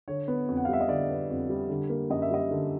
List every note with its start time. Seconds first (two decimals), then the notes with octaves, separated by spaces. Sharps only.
0.08 D3 C#5
0.28 B3
0.48 F2
0.57 F#5
0.65 F5
0.68 G3 E5
0.81 D#5
0.89 D3 D5
1.09 B3
1.30 F2
1.49 G3
1.70 D3
1.90 A#3
2.10 F#2 D#5
2.22 E5
2.30 G3 D#5
2.51 D3